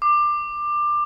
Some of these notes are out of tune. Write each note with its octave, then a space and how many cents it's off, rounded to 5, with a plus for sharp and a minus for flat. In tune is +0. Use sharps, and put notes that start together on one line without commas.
D6 +20